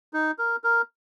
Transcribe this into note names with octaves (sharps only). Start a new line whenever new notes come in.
D#4
A#4
A#4